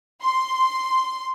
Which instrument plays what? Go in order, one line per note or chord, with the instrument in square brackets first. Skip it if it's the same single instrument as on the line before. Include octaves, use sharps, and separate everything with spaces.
[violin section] C6